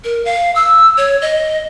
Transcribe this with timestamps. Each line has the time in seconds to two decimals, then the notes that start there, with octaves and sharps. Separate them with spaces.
0.04 A#4
0.25 F5
0.55 E6
0.97 C#5
1.22 D#5